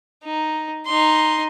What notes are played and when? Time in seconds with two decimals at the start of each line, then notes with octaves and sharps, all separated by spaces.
0.24 D#4
0.86 D#4 C6